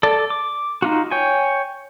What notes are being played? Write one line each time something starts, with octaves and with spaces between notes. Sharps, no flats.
A4 D5
D6
D#4 F4 F#4
C#5 G5 G#5